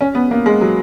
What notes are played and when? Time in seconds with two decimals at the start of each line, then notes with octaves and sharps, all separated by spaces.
0.01 C#4
0.15 B3
0.31 A#3
0.46 G#3
0.61 F#3